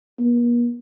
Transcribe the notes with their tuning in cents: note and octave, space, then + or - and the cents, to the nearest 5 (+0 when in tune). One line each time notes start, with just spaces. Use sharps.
A#3 +45